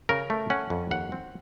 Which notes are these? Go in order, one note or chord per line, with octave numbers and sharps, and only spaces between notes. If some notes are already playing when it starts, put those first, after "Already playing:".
C#3 A#4
A3
C#4 F#5
F2
D#2 F#5
C4